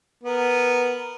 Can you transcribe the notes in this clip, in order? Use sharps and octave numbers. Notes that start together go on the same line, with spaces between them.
B3 A#4